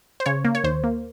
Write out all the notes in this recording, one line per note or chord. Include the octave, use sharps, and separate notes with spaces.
C5
C#3 C#5
A#3
C#5
D#2 C5
A#3